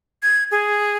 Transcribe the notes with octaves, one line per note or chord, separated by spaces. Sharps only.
G#6
G#4